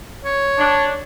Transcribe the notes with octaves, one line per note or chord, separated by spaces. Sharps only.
C#5
D4